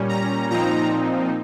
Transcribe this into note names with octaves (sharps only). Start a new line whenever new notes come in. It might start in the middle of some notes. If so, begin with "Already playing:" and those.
Already playing: A#2 G3 C#4
A#5
A#2 F3 C4 D#4 A#5